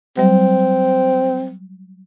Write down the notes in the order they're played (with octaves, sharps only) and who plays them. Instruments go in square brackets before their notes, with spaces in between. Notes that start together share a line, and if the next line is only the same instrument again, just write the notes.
[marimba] F#3 G3 [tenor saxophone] C4